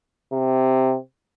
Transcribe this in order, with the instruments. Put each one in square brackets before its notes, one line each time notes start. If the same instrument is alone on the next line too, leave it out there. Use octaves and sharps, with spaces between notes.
[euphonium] C3